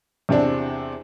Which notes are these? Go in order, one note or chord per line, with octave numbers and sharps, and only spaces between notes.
E2 C3 C4 D4